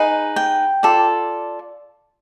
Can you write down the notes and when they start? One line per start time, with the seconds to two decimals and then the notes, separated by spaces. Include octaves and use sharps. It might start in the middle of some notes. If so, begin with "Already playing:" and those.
Already playing: D#4 G#4 B4
0.36 G5
0.83 F4 A4 D5